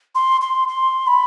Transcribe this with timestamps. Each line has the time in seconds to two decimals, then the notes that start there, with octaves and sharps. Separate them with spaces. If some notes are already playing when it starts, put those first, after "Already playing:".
0.15 C6
0.41 C6
0.68 C6
1.07 B5